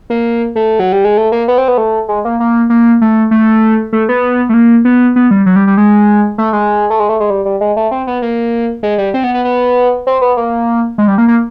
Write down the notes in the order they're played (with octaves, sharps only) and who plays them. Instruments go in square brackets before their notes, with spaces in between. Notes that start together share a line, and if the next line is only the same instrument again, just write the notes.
[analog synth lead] A#3
A3
F#3
G3
G#3
A3
A#3
B3
C4
B3
A3
G#3
A#3
A#3
A#3
A3
A3
A3
B3
A3
A#3
B3
B3
G3
F#3
G3
G3
G#3
A3
G#3
A3
G#3
A3
G#3
G3
G3
G#3
A3
C4
B3
A#3
G#3
G3
C4
B3
B3
B3
C4
B3
A#3
G#3
G3
A#3
A#3